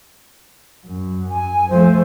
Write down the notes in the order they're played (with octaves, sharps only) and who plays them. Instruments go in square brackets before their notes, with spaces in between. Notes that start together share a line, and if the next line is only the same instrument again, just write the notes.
[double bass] F#2
[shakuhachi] G#5
[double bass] F3 A3 [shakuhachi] C5